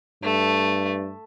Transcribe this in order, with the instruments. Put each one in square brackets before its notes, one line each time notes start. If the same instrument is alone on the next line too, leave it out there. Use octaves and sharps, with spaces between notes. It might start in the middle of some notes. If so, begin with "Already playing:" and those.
[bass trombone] G2 [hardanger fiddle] A3